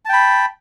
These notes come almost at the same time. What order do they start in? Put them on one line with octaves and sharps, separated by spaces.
A5 G5 B5